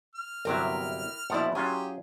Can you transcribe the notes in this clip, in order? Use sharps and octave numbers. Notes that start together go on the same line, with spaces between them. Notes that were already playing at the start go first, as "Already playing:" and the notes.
F6
G1 C3 F#3 E4 G4 A#4
A#1 B2 F3 E4 D5 F#5
F#3 C#4 F4 G4 G#4